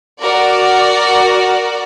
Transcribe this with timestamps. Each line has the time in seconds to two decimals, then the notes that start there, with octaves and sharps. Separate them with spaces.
0.20 F#4 A#4 D5